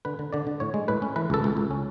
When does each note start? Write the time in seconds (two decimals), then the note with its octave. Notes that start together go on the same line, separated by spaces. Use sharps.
0.05 D3 B4
0.19 D3
0.33 D3 D5
0.47 D3
0.60 A2 C#5
0.74 G#3
0.88 A2 B4
1.02 C#4
1.16 E3 B4
1.30 C#2 A4
1.44 C#2
1.57 C#2
1.71 C#4